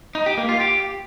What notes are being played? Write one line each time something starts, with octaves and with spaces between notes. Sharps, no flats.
D#4
G4
A#3
F4
G4